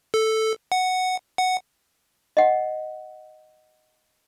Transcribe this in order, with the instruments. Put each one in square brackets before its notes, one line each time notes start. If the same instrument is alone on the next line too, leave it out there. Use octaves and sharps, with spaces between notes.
[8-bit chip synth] A4
F#5
F#5
[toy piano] D#5 F#5